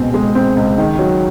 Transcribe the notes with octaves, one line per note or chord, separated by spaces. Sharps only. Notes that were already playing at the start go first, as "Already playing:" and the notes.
Already playing: C#2 B2 G#3 C4
G#3
C4
C#2
D#3
F#3